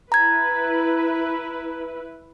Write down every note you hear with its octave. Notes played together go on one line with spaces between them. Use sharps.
E4 B4 A#5 G#6